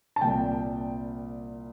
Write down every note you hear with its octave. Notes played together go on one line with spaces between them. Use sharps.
A5
C2 A#2 G3 G5